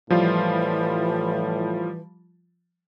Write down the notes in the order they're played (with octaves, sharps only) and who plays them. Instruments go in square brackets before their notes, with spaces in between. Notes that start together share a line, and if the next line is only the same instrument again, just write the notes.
[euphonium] A2 [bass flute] E3 [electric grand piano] F3 G3 F4